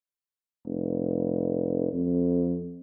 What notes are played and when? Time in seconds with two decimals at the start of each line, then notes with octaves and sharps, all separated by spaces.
0.66 F1
1.93 F2